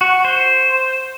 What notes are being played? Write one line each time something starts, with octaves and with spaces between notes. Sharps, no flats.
F#4
C5